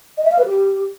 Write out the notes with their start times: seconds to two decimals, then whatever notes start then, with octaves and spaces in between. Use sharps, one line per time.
0.18 D#5
0.25 E5
0.31 F5
0.38 B4
0.45 G4